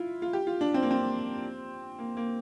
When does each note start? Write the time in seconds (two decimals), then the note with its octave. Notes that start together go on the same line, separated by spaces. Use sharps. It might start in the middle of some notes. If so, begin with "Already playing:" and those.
Already playing: E4 F4
0.22 F4
0.33 G4
0.47 F4
0.61 D4
0.74 C4
0.82 A#3
0.91 C4
1.99 A#3
2.17 A#3